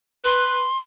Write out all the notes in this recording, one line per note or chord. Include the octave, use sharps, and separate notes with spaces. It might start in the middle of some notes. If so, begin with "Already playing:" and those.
B4 C6